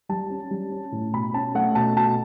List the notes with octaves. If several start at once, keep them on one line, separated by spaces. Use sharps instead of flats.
G3 A5
C#4
G3
C#4
A2
B2 B5
C#4 A5
A3 F#5
B2 A5
B2 A5